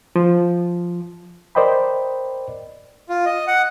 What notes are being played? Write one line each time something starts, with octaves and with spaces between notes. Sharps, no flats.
F3
A#4 C5 D5 D#5 G5 B5
F4
D#5
F#5